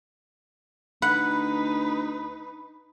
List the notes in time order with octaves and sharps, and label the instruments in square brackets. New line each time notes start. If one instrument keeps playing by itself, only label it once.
[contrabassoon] D2 [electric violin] D#4 B4 [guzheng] F#5 [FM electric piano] B5